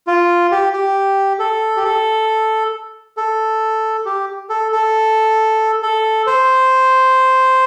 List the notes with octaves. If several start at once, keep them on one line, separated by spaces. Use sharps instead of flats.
F4
G4
G4
A4
G4
A4
A4
G4
A4
A4
A4
C5